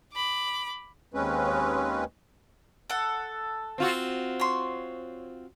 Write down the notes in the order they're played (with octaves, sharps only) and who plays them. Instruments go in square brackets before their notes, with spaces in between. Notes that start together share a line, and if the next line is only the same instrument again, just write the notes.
[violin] B5 D6
[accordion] D#2 G#3 C4 C#4 B4
[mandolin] A4 F#5
[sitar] C4 F4 F#4
[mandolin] C#5 C6